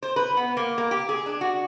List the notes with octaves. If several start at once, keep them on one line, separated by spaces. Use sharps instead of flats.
C5
B4
B3
A#3
A#3
G4
G#4
D4
F#4